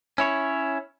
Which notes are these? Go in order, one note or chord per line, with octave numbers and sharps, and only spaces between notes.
C#4 E4 C#5